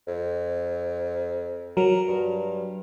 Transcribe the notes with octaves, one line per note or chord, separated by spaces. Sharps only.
F2
F#3 A#4
G2